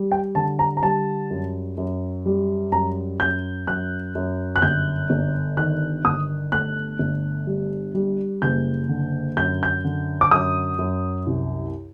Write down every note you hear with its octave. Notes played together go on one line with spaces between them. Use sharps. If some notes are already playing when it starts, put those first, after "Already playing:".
Already playing: G3
G5
D3 A5
A#5
A#5
G3 A5
F#2
F#2
G3
F#2 A#5
F#2 G6
F#2 F#6
F#2
F#6
G1 G6
G1
D#3 F#6
G1 D#6
A3 F#6
G1
G3
G3
F#1 G6
D3
F#2 G6
G6
D3
D6
F#2 D#6
F#2
C2